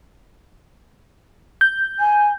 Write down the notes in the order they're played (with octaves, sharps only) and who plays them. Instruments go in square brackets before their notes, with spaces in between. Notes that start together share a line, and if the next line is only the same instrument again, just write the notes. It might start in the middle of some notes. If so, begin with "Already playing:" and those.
[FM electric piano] G6
[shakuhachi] G#5